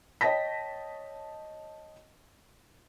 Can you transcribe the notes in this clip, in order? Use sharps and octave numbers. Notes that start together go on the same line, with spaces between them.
C#5 D#5 G5 A5 A#6 B6